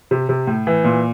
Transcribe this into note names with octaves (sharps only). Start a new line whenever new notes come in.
C3
C3
A2
E3
A#2